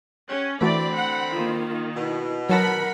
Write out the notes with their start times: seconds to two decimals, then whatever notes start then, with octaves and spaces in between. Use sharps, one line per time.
0.28 C#4 G4 C#5 F#5
0.61 D3 E3 A3 C4 F#4 D5 B5
0.94 F#5
1.33 D#3 A#3 F4
1.95 B2 E4
2.49 F#3 A#4 F#5 A5 B5 A#6